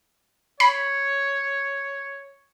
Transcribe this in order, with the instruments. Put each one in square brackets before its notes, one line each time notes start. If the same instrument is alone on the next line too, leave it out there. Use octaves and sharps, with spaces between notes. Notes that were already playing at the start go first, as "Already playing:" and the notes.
[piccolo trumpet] C#5 [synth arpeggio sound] B5